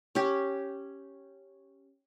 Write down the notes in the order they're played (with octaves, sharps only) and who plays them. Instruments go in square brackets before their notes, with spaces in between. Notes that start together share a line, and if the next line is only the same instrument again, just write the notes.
[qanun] C#4 G4